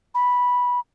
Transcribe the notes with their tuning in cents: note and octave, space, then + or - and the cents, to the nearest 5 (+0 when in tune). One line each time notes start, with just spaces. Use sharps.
B5 -10